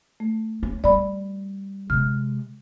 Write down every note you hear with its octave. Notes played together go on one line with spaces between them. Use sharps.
A3
C#4
G3 D5 B5
C3 G#3 F6